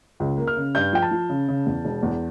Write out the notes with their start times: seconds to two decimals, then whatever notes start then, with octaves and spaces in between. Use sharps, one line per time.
0.20 C#2
0.38 A#3
0.47 F6
0.57 C#3
0.75 G2 G6
0.93 F3 G5
1.02 A5
1.11 F3
1.30 C#3
1.48 C#3
1.66 E2
1.84 E1
2.03 E2